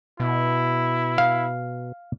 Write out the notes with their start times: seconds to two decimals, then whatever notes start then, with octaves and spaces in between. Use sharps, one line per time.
0.20 B2 E4
1.18 F5